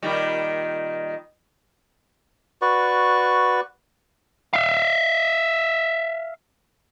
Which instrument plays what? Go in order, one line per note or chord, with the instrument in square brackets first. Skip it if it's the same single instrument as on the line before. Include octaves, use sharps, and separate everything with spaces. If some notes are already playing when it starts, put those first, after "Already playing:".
[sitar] A#2 D#3 G3
[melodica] F#4 B4 D5 C#6
[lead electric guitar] E5 F5